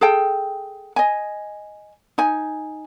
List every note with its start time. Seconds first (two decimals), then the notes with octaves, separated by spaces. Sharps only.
0.01 G#4 A4 G5
0.96 D#5 G#5
2.18 D#4 G#5